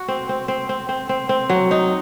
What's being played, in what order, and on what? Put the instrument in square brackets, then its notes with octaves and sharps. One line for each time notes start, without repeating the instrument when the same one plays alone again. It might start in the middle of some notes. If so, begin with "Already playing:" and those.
Already playing: [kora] F#4
C4
C4
C4
C4
C4
C4
C4
F#3
D#4